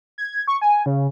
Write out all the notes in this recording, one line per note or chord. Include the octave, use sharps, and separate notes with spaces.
G#6
C#6
G#5
C#3